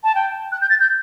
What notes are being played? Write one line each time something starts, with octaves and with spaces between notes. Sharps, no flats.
A5
G5
F#6
G6
A6
G6